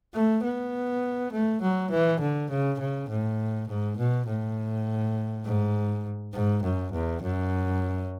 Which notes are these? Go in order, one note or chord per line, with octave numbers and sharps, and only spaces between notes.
A3
B3
A3
F#3
E3
D3
C#3
C#3
A2
G#2
B2
A2
G#2
G#2
F#2
E2
F#2